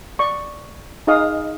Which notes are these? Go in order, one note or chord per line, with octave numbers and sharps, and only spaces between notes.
D5 C#6
D#4 G#4 D#5 F5 D#6